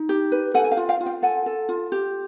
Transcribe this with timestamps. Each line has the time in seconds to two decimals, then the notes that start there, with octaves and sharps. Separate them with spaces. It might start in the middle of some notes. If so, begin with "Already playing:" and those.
Already playing: D#4
0.09 G4
0.32 B4
0.54 A4 F#5 G#5
0.64 G#5
0.71 F5 G5
0.77 F4
0.89 F5 G5
1.00 F4
1.06 F5 G5
1.22 A4 F#5 G#5
1.46 A4
1.69 F4
1.92 G4